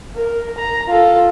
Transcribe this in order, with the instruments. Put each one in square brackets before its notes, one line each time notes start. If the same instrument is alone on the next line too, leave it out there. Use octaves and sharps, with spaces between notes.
[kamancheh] A#4
A#5
F4 A4